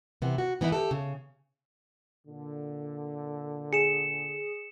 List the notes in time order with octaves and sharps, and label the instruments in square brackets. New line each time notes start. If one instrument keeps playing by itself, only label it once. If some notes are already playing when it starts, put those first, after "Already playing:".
[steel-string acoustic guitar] C3 E3 B3
F#4
E3 B3 D#4 E4
G4 A4
C#3
[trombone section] A#2 D3
[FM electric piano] G#4 [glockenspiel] C#7 E7